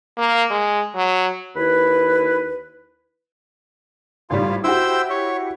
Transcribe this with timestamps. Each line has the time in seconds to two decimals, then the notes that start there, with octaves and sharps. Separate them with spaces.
0.18 A#3
0.51 G#3
0.95 F#3
1.56 D#2 E4 B4
4.30 G#1 A2 G3 F4
4.64 E4 F#4 G4 C5 G5 E6
5.10 C#5